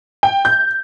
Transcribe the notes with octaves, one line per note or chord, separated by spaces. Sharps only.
G5
G6